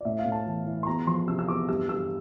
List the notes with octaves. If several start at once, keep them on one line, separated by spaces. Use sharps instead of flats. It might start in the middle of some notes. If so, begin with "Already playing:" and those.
D5
A2 E5
F5
A2
A5
E3
E3
C6
E2 A#5
F3 C6
C3 E6
E6
E2 D6
G2 E6
G2 E6